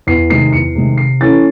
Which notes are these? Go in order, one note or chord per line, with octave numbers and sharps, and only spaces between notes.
E2 C7
C3 D#3 G#3 C7
E2 C#7
C3 D#3 G#3
C3 C7
E3 A3 C#4 E4 A6